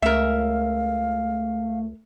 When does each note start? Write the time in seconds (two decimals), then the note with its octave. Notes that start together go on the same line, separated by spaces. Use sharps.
0.02 C#2 A3 A#4 E5 F5